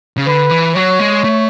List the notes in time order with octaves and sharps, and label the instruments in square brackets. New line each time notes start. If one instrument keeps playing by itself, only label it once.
[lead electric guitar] C#3
[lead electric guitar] D3 [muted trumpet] B4
[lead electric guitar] E3
[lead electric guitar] F#3 [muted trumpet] C#5
[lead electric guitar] G#3
A3